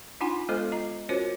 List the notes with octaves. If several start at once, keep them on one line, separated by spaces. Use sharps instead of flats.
D4 D#4 F4 F#5 G#5 C6
G#3 B3 F4 A4 C5 D#5
F4 D#5 A#5
C#4 F4 F#4 A#4 C5 C#5